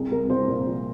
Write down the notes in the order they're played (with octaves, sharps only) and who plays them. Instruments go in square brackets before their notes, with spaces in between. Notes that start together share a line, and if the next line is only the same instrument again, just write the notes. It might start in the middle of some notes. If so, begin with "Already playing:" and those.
Already playing: [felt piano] C2 G#4
C2 A#4
C2 C5
A#2 A#4
F3